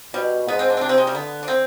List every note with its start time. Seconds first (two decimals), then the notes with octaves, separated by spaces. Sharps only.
0.14 B2 G3
0.47 G#2 B3
0.59 C4
0.70 D4
0.77 C4
0.81 C3 D4
0.89 C4
0.98 G#3
1.07 G3
1.15 D3 B3
1.43 D4
1.48 C4